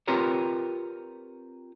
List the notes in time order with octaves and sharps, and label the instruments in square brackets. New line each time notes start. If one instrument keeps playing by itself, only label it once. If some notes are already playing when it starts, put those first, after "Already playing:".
[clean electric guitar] C4 F4 G4 A#4 B4 C#5